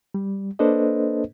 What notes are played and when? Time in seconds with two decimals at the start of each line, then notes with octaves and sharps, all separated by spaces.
0.14 G3
0.59 A#3 D4 A4 B4 C5 D#5